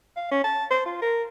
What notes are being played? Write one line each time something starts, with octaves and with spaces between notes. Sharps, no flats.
F5
C#4
A5
C5
F4
A#4